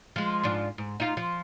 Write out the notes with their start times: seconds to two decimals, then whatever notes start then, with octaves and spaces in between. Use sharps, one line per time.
0.16 F3 G#3
0.43 G#2 F3 D4
0.78 G#2
1.00 D#4 F4
1.17 F3